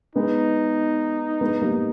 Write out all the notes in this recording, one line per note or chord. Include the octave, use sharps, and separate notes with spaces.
G#3 B3 D#4
G#3 B3
G3 A#3